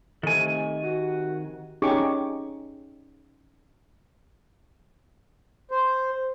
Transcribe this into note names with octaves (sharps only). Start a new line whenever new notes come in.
C3 D#3 A3 G#5
C3 F#4
C#4 D#4 G4 G#4 C#6 D6
C5